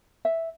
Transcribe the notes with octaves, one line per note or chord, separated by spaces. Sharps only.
E5